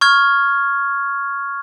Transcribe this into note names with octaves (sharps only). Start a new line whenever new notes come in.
C#6 F6 G#6